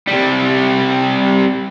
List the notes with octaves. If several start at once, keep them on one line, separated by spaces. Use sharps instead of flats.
C3 G3